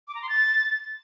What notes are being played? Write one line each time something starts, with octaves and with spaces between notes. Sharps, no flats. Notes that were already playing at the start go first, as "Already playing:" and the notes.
D6
A#5
C6
A6